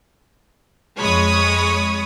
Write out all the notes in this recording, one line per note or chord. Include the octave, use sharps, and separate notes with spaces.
F2 G#3 C#5 B5 C#6 D#6